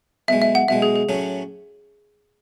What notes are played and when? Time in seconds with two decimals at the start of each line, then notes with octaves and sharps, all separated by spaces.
0.28 B1 B2 G#3 E5
0.42 E5
0.55 F#5
0.68 B1 B2 G#3 E5
0.82 G#4
0.96 G#4
1.09 A2 F#3 A3 C#4